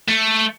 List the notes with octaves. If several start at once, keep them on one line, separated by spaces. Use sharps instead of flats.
A3